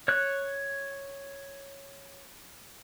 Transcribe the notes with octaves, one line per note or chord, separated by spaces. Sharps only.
C#5 F#6